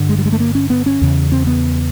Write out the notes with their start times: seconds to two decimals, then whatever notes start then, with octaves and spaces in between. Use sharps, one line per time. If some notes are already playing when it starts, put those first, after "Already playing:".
Already playing: G2 D3
0.09 G#3
0.18 G3
0.25 G#3
0.32 A3
0.40 A#3
0.55 C#4
0.70 B3
0.86 C#4
1.01 E2 C#3
1.32 C4
1.47 B3